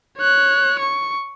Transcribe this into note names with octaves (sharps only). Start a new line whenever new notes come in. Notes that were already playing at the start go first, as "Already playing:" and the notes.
C#5 F#6
C#6